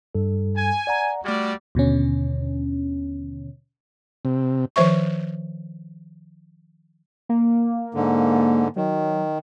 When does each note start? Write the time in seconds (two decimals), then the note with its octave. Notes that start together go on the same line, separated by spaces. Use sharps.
0.15 G2 G3 A4
0.56 G#5
0.87 D5 F#5 A#5
1.25 G3 A3 F#4 D5 F6 G#6
1.75 D#2 B2 D3 C#4
4.25 C3
4.76 D#3 F3 C5 E5 C#6
7.29 A#3
7.95 G#2 D3
8.76 D#3 F#3